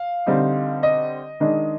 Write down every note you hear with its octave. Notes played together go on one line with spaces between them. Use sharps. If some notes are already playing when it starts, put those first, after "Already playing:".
Already playing: F5
D3 G3 C4 D#4
D#5
D#3 G#3 D4